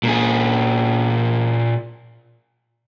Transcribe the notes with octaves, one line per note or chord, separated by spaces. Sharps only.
A#2 G#4